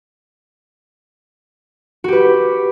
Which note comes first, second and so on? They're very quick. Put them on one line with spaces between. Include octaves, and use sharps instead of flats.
F#4 G4 B4